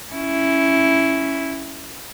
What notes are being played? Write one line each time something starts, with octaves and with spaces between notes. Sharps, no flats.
C#4 E4